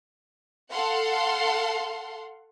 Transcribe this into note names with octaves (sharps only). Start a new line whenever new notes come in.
A4 F5 F#5 C6